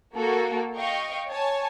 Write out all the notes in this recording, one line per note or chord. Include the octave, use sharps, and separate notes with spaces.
A#3 F#4 A4
D#5 F5 G5 C#6
C#5 G#5 A5